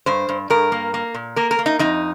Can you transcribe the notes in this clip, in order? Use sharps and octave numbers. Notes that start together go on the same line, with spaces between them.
G2 C5
G2
G2 A#4
A#3
A#3
A#2
A#3 A#4
A#4
A#3
D#4
F2 D#4